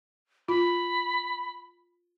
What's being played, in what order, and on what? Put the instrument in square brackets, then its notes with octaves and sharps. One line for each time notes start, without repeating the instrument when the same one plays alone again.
[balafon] F4 [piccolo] B5